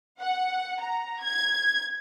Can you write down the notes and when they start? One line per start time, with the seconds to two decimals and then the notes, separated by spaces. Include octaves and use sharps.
0.20 F#5
0.81 A#5
1.22 G#6